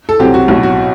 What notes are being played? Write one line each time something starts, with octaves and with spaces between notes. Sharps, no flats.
A4
C2 C3 F#3 C4 G4
F#4
B1 A2 F#3 F#4
F#4